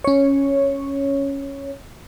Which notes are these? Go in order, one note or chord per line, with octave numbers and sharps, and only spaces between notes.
C#4 C#5